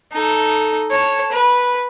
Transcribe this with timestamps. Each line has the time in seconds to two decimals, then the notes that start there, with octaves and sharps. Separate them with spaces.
0.13 D#4 A4
0.91 C#5 A5
1.32 B4